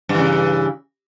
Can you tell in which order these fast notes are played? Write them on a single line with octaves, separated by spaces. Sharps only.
G2 E3 C#3